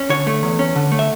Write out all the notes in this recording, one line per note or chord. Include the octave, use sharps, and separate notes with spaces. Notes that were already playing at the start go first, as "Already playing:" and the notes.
Already playing: C#4
D3 C#5
A3
E2
C#4
D3
A3
E5